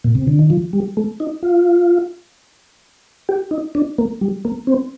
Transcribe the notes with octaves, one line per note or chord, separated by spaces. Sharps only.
A#2
C3
D3
D#3
F3
G3
A3
D#4
F4
G4
D#4
D4
A#3
G3
A#3
C4